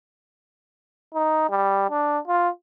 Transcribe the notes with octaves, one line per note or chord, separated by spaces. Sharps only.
D#4
G3
D4
F4